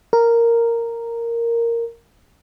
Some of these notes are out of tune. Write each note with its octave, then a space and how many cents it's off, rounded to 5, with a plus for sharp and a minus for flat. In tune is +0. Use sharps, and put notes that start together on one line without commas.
A#4 -5